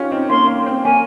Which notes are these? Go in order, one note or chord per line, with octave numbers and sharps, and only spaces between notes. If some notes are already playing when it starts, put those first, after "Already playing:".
Already playing: C#4 D#4 F4 G4
C4 D#4
A#3 C#4 C6
A#3
C4
A#3 C#4 G#5